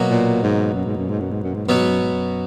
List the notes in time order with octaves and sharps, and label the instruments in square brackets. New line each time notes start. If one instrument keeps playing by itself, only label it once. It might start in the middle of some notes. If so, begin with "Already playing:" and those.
Already playing: [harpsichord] B2 F#3 A#3
[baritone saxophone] A#2
G#2
F#2
G#2
F#2
G#2
F#2
G#2
F#2
G#2
[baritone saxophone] F#2 [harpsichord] B2 F#3 B3
[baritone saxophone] G#2
F#2
G#2
F#2